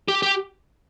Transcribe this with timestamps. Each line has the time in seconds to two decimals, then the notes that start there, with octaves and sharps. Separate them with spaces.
0.08 G4
0.22 G4